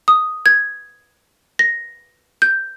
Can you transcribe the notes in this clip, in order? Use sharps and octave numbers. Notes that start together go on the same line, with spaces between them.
D#6
G#6
A#6
G6